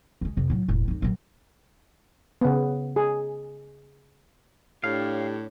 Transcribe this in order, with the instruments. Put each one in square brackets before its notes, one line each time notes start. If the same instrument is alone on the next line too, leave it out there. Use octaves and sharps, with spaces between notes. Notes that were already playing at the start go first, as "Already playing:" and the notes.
[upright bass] C#2 G#3
F2 C3
A2 F#3
E1 A2
F2 D#4
A#1 F#3
[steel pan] C#3 B3
G#4
[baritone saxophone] A2 [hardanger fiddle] D4 C#5 [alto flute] G4 [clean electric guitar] F5